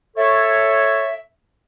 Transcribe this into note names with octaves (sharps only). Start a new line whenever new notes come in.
A4 C#5 E5